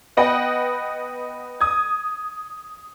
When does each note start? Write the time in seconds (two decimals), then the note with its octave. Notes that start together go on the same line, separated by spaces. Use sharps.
0.17 B3 B4 D#5 F#5 G5
1.61 D#6 G#6